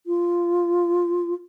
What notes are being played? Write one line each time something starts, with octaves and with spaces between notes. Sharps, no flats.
F4